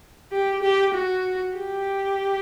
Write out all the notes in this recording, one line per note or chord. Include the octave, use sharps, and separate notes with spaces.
G4
G4
F#4
G4